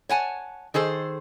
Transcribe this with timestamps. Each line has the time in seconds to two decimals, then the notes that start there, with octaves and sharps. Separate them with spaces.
0.09 C#5 F#5 G#5 A5
0.74 D#3 G#4 A4 C5